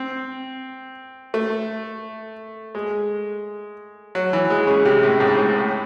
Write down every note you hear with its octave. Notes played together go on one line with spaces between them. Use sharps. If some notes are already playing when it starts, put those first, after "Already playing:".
Already playing: C4
A3
G#3
F#3
E3
G#3
C#3
C3
A2
G#2
A2
A2